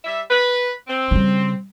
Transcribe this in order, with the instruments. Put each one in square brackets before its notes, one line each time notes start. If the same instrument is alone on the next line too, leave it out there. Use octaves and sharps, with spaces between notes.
[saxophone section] G3 E5
B4
C4
[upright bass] C#3 G3